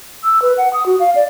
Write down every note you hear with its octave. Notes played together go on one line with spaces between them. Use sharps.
E6
B4
F#5
D#6
F#4
F5
D5